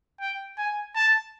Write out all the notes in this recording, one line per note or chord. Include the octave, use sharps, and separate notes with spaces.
G5
G#5
A5